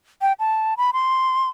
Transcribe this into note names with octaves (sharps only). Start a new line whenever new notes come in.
G5
A5
B5
C6